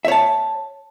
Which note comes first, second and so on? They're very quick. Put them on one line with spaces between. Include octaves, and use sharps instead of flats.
E5 C#5 A5